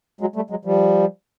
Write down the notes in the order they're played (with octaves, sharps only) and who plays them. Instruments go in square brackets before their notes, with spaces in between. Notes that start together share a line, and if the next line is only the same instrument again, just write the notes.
[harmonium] F#3 G#3
G3 A3
F#3 G#3
F3 G3